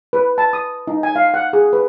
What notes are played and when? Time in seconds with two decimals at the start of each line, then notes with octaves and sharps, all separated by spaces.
0.13 B4
0.38 A5
0.53 D#6
0.87 D#4
1.03 G#5
1.16 F5
1.34 F#5
1.53 G#4
1.73 B4